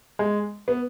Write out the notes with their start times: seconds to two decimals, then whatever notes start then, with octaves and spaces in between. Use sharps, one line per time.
0.19 G#3
0.68 B3